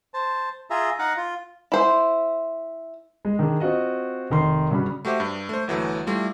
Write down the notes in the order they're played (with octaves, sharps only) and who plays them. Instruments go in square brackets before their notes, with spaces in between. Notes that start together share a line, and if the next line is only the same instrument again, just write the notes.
[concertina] C5 A5
F4 G#4 E5 A#5
D#4 F5 F#5 A#5
F4
[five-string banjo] E4 C5
[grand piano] G#3
D#3 D4 G#4
C4 F4 F#4 D#5
F1 D#3 C6
G2 C#3 F#4 B5
[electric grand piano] A3 F#4 G4 C5 E5
G2
A3 C5
G1 E3 F#3 A3
G3 A3 E4 F4